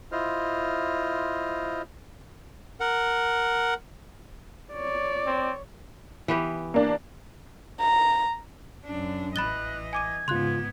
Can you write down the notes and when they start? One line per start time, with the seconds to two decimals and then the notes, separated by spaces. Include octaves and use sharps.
0.12 E4 F4 C5 D#5 F6
2.80 A#4 F#5
4.74 C#5 D5
5.27 C4
6.28 E3 B3 G4
6.74 A#3 D4
7.80 A#5
8.85 F#2 D4
9.36 A1 E3 D#5 B5 F#6 A6 G7
9.93 G#5 D6 G#6 D#7
10.28 G#2 C#3 B3 F4 C6 F#6